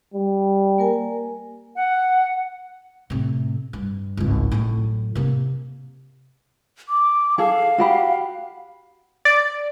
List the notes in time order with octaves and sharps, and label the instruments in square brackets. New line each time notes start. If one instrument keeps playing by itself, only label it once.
[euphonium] G3
[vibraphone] A#3 A#4 G#5
[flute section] F#5
[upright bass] A2 C3
G2
G#1 C#2
A2 F#3
C3 A#3
[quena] D6
[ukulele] G#4 A4 [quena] F5
[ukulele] F#4 G4 B5
[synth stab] D5